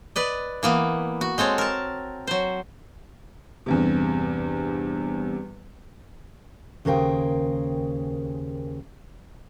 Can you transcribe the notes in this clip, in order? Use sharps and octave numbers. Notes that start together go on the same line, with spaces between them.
B4 D5 D#5
E3 A#3 B3
F#4
G#3 C4 A4 C#5
A#4 A5
F#3 C5
E2 G2 C3
D#2 C#3 G#4 A#4 C5 G5